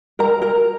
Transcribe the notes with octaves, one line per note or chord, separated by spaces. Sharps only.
A#4 A#5
A#4 A#5